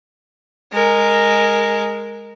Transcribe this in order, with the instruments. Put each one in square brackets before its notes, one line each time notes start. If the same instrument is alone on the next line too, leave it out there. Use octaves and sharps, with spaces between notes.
[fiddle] G#3 A#4